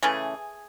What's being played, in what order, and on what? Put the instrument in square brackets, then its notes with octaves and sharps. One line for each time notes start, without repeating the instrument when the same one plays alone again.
[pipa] C#3 E3 A3 G#4